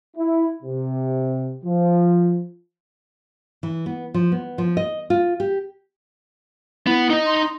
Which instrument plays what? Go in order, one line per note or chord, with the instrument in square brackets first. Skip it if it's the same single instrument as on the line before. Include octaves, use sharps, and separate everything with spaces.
[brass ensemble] E4
C3
F3
[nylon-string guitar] E3
B3
F3
B3
F3
D#5
F4
G4
[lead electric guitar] B3 [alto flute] E4
[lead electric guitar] D#4 D#5
[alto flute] C6